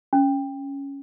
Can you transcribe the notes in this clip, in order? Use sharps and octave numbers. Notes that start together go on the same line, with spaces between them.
C#4